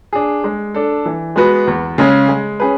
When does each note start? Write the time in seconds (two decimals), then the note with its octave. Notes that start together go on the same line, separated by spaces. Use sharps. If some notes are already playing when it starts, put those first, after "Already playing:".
0.13 D4 G#4
0.44 G#3
0.74 D4 A4
1.05 E3
1.36 G#3 B3 F#4 B4
1.67 E2
1.98 C#3 G#3 C#4
2.29 G#3
2.60 C#4 G#4 B4